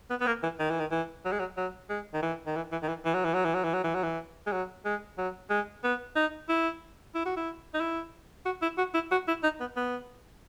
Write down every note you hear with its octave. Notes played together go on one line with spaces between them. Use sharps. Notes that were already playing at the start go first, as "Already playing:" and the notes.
B3
B3
A#3
E3
D#3
E3
D#3
E3
F#3
G#3
F#3
F#3
G#3
D#3
E3
D#3
E3
E3
D#3
E3
E3
F#3
E3
F#3
E3
F#3
E3
F#3
E3
F#3
E3
G#3
F#3
G#3
F#3
G#3
B3
D#4
E4
E4
F#4
E4
D#4
E4
F#4
E4
F#4
E4
F#4
E4
D#4
B3
B3